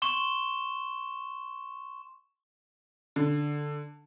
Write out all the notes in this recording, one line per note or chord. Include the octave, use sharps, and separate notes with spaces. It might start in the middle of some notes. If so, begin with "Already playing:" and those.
C6 C#6 E7 G7
D3